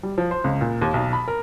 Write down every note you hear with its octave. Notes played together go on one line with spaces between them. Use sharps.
G3
F3
C5
C#2
A#2
D#2
B1
B5
A#4